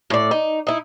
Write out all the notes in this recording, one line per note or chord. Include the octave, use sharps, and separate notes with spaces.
A2 D5
D#4
D#4 E4